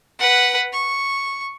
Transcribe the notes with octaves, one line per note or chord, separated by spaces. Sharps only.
B4 F#5
C#6